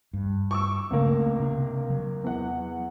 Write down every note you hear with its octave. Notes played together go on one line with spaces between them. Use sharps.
G2
C#6 D6 E6
C#2 C#3 A3 A#3 C4
C3 D4
F#3
E2 F#5